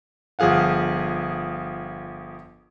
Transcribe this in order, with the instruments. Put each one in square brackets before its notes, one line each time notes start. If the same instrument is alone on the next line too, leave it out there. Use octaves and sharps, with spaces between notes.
[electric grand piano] G1 F3 G#4 F5 F#5